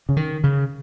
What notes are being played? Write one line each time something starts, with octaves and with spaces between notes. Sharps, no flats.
C#3
D#3
C#3